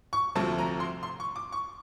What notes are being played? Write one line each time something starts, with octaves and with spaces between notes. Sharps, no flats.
C#6
D2 C3 F3 A3 C4 A5
A#5
C6
C6
C#6
D6
C#6